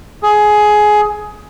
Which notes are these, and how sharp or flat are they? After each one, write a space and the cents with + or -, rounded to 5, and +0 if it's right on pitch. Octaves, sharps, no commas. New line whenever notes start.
G#4 +15